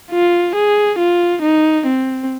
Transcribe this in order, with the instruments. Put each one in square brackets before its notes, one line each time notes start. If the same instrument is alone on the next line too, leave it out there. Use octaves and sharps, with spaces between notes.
[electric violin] F4
G#4
F4
D#4
C4